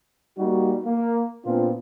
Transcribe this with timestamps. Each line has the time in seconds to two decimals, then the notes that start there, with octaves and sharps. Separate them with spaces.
0.39 G3 A#3 D#4 F#4
0.84 A#3
1.46 A#2 B3 C4 D4 F4